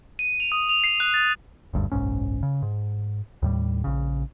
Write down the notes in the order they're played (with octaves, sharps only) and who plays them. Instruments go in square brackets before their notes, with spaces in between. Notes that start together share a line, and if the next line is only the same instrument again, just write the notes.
[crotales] D#7
F7
D#6
F7
C7
F#6
A6
[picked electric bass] F#1 D2 G2
F#1 B1 G#2 C#4
C#3
G#2
D#2 A2 G3
A#1 C#3